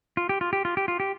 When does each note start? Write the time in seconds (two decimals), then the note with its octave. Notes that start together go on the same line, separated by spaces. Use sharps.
0.17 F4
0.29 G4
0.41 F4
0.53 G4
0.65 F4
0.77 G4
0.88 F4
1.00 G4